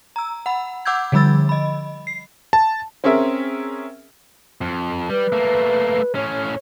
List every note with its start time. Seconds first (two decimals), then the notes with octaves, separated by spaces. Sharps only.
0.16 A#5 E6
0.46 F#5 B5
0.85 F#5 D6 E6 G6 G#6
1.12 D3 F3 G3 B5 E6 A6
1.49 D#5 B5
2.07 C7
2.53 A5
3.04 C4 C#4 G#4 A#4 E5
4.61 F2
5.10 G3 B4
5.32 A3 A#3
6.15 A2 C#4 C#5